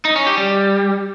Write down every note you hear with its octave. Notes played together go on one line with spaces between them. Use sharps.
D#4
C#4
G4
G3